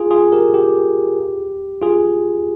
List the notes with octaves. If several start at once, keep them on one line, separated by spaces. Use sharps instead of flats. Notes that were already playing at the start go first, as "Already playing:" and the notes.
Already playing: F4 G#4
F4 G#4
G4 A#4
G4
F4 G#4